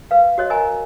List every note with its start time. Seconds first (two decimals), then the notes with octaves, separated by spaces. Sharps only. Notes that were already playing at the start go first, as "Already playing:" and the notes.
0.11 B4 F5
0.38 F#4 C#5 D#5
0.50 A#4 D#5 G#5 A#5